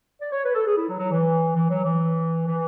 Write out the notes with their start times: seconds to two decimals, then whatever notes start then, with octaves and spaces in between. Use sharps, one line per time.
0.21 D5
0.32 C#5
0.44 B4
0.54 A4
0.66 G#4
0.77 E4
0.88 F#3
0.99 F#3
1.11 E3
1.56 E3
1.70 F#3
1.84 E3
2.46 E3